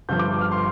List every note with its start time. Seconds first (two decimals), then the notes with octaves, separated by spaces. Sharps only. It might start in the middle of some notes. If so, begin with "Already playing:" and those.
0.09 G1 G2 F3 G6
0.19 D6
0.41 F6
0.52 C6